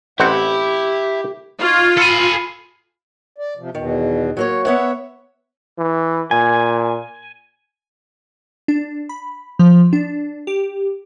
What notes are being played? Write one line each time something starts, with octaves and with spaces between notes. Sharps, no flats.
A1 C4 E4 G4 F#5
D#4 F4 C#6 G#6
A4 G#5 B5
D5
C3 F3
E2 B2 D#3
F#3 A#3 C#5
B3 C#5 E5 F#5
E3
A#2 G#5
D4
B5
F3
D4
G4